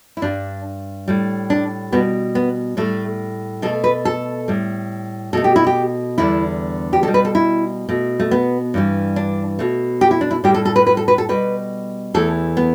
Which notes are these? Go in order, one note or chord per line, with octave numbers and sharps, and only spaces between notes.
E4
G2 G3 D4
A2 G3
D4
B2 G3 B3
B3
A2 G3 A3
B2 A3 A4
B4
A4
A2 G3
B2 A3 A4
G4
E4
G4
E2 D3 G3 E4
G4
B2 G3 A4
B4
A4
E4
B2 A3
A3
B3
G2 E3 G3
D4
B2 A3
G4
E4
D4
E4
A2 G3 G4
A4
A4
B4
B4
A4
B4
A4
B2 G3 B4
E2 E3 A3 A4
B3